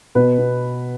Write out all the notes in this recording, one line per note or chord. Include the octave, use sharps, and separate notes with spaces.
B2 B4
B3